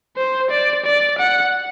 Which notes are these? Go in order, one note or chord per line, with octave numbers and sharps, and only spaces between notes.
C5
D5
D5
F#5